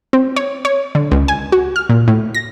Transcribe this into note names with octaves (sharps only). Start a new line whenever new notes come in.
C4
C#5
C#5
D3
C#2
G#5
F#4
F6
A#2
A2
A#6